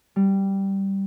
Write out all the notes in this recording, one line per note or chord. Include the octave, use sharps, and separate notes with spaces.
G3